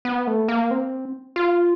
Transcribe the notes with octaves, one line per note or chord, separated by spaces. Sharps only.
B3
A3
A#3
C4
F4